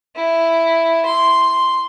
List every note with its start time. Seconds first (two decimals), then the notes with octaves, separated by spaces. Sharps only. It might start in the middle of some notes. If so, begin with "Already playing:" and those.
0.16 E4
1.06 C6